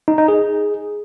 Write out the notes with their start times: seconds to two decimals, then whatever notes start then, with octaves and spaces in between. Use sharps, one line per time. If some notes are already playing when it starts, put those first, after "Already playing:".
0.08 D#4
0.18 D#4
0.28 G#4